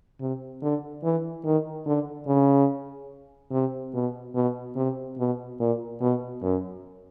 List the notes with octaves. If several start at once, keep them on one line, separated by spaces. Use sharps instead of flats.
C3
D3
E3
D#3
D3
C#3
C3
B2
B2
C3
B2
A#2
B2
F#2